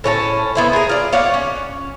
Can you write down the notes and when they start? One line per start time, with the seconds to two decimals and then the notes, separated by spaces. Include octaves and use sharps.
0.04 A2 C#4 G4 A5
0.55 B3 E4 C5
0.73 G#4 A#4
0.89 F4 D5
1.12 F4 C#5 D5 F#5
1.34 C#4